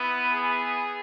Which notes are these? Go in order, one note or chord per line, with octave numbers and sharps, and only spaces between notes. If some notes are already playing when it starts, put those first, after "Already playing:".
Already playing: B3 E4
G#4